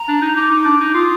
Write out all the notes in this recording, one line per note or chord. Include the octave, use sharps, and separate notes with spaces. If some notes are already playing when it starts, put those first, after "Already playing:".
Already playing: A#5
D4
D#4
D#4 D6
D#4
D4
D#4
F4 D#6